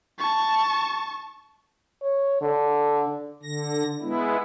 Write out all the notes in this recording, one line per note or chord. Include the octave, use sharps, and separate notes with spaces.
A5 C#6
C#5
D3
D3 A#6
G#3 B3 E4